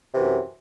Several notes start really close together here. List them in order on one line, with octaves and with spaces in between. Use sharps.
C3 E3 F#2